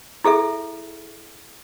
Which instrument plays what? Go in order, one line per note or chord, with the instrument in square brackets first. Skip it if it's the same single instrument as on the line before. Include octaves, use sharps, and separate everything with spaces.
[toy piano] E4 G#4 A4 E5